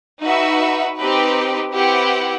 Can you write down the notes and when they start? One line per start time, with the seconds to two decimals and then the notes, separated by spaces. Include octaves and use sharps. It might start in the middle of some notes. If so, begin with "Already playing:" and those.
0.22 D#4 F#4 B4 E5
0.97 C4 D#4 G4 B4
1.72 C4 E4 G4 B4 F#5